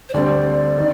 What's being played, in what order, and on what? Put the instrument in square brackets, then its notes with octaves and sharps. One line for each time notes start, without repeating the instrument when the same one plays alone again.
[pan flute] C5
[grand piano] D2 D3 G3 C4 [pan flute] D5
[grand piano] D#3